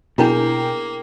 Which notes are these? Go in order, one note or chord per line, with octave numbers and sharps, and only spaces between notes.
B2 A#3 D4 E4 F4 G#4 A#4 G5